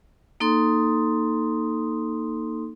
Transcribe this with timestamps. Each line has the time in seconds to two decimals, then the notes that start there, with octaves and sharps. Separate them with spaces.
0.40 A#3 D#4 A4 C6 D#6